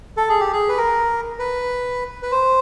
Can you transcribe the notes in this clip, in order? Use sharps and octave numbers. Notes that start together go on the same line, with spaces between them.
A4
G#4
G4
G#4
B4
A#4
B4
B4
C5